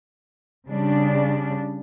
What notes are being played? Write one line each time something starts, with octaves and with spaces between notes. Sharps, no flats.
C#3 G3 D4